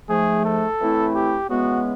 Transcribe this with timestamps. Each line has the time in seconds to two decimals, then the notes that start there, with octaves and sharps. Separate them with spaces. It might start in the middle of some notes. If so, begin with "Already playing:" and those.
0.09 G#2 F3 A3 G#4
0.45 A4
0.80 A2 E3 A3 C4 E4
1.15 G4
1.49 C#3 E3 G#3 B3 F#4